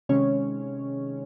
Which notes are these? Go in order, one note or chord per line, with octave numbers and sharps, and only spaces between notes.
C3 D#3 G#3 C#4 C#5